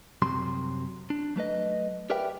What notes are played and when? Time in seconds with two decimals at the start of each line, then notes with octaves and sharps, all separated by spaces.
0.22 C2 F#2 C3 F#3 C6
1.10 D4
1.36 F#3 A3 B4 D#5
2.10 G4 A#4 B4 D5 E5 G5